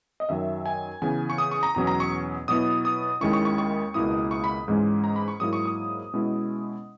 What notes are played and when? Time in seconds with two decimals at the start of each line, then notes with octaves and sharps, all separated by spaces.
0.20 D#5
0.29 F#2 D#3 F#3 E5
0.66 G#5
1.02 C#3 E3 B3 G#5
1.30 C#6
1.38 D#6
1.51 C#6
1.63 A#5
1.75 E2 B2 F#3 C#4 A#5
1.87 A#5
2.00 C#6
2.48 B2 F#3 B3 E4 D#6
2.85 D#6
3.21 D#2 D#3 G#3 C#4 E4 C#6
3.33 C#6
3.45 C#6
3.58 C#6
3.94 C#2 B2 A#3 E4 D#6
4.31 C#6
4.44 B5
4.68 G#2 E3 G#3 C#4
5.04 A#5
5.16 B5
5.28 C#6
5.40 G#2 F#3 A#3 E4 D#6
5.53 C#6
5.66 D#6
6.14 B2 G#3 C#4 E4